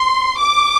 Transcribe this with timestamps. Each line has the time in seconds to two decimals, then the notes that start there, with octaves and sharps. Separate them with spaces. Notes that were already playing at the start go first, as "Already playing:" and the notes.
Already playing: C6
0.39 D6